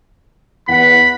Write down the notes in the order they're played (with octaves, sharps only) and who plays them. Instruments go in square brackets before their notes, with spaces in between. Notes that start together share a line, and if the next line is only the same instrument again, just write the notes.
[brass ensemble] E2 F#5 [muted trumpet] B5